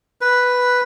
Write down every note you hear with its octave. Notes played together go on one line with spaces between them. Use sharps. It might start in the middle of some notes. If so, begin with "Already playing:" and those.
B4